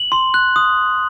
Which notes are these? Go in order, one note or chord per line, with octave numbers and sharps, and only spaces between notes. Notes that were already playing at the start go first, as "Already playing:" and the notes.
Already playing: F#7
C6
F#6
D#6